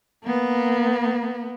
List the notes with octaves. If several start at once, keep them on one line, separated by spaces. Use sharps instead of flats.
A#3 B3